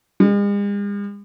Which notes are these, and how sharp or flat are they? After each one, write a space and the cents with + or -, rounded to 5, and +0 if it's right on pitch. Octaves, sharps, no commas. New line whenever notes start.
G#3 -45